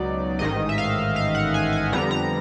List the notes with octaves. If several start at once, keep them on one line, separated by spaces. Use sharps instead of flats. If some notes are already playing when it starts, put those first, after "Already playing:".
Already playing: C#2 B2 F#3 B3 D#4 D5
A1 G#2 D#3 D#5
E5
F5
F5
F#5
G#5
G#5
F2 D3 G3 B3 A#5
A#5